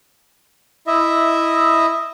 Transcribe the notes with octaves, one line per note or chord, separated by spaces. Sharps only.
E4 D#5 E5